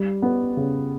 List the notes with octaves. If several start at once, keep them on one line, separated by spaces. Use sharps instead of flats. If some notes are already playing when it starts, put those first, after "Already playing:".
Already playing: G3
B3
C#3